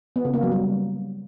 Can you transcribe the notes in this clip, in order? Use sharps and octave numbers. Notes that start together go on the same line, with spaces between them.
B3
C#3
A#3
F#3
G3